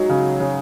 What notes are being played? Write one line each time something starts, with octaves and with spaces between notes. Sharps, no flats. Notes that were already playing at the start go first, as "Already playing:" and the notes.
Already playing: F#3 G#3 D#4
C#3
C#3